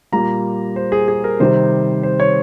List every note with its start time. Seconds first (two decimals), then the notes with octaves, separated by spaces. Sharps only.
0.12 A#2 G3 A#3 A#5
0.76 C5
0.92 G#4
1.08 G#4
1.24 A#4
1.40 C3 D#3 G3 C4 C5
2.03 C5
2.20 C#5